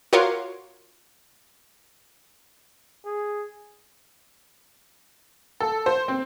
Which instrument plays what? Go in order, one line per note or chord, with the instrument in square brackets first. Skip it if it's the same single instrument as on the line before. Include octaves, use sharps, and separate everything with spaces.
[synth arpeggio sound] F4 F#4 A#4 C#5 C6 D6
[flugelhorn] G#4
[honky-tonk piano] A4
C5
C4